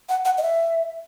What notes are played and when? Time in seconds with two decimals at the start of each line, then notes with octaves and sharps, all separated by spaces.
0.09 F#5
0.25 F#5
0.38 D#5
0.42 E5